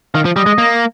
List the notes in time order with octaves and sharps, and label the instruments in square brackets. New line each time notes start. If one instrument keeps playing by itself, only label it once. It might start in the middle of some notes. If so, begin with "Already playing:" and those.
[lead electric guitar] D#3 [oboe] F5
[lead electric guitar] F3
[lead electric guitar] G3 [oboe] D#5
[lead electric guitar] G#3
A#3